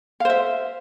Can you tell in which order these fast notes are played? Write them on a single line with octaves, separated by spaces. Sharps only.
F5 C5 E5